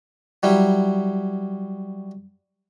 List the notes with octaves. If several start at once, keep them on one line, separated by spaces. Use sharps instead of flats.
F#3 G3 E4